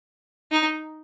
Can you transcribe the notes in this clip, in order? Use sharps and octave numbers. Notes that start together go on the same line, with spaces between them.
D#4